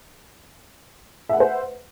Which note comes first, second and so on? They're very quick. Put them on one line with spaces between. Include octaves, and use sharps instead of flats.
E5 F#5 B4 C5